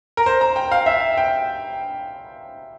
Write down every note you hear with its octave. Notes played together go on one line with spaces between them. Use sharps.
A#4
C5
A#5
G5
F5
E5
G5